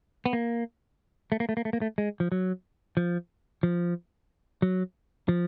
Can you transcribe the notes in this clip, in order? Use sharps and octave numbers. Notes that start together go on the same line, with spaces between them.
B3
A#3
A3
A#3
A3
A#3
A3
A#3
A3
G#3
F3
F#3
F3
F3
F#3
F3